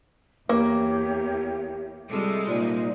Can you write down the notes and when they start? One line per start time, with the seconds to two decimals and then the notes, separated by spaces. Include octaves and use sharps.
0.49 E2 A#3 G4 C#5 E5
2.09 C3 G3 G#3 F4 A4 D6
2.46 A#2 D#4 C5